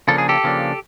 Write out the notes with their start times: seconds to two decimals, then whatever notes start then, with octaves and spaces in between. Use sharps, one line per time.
0.08 C#3 F3 A#3 D4 A4
0.18 G#4
0.29 G4 A4
0.44 C#3 F3 A#3 D4